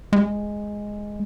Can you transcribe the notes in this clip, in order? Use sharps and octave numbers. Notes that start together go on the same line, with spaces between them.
G#3